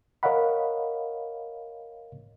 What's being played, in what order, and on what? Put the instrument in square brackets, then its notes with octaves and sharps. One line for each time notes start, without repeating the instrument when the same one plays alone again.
[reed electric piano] A#4 C#5 D#5 F5 F#5 B5